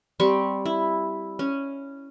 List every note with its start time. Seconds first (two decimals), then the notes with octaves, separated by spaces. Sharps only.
0.20 G3 C4 C#6
0.66 E4
1.39 C#4